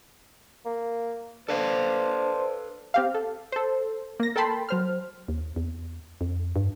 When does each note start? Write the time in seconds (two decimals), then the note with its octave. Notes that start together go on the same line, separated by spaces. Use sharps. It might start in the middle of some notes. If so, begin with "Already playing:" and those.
0.65 A#3
1.49 D4 A4 B4 C5 F5
2.94 C4 G4 F5
3.14 A4
3.52 A4 C5
4.20 A#3 A#6
4.36 A4 A#4 G5 A5 B5 C6
4.69 F#3 C5 F6
5.28 D#2
5.56 E2
6.21 F2
6.56 G2